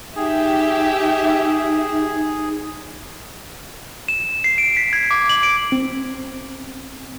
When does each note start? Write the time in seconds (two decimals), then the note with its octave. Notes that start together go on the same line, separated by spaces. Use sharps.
0.16 D#4 G4 G#4 E5
4.08 E7
4.44 C7
4.58 D7
4.77 B6
4.93 G#6
5.11 D6
5.29 F#7
5.43 D7
5.72 C4